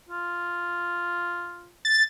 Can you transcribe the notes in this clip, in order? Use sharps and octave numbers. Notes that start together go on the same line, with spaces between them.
F4
A6